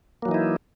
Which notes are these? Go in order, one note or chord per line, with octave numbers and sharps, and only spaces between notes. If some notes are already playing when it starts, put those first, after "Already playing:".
E3 F#3 A#3 D#4 E4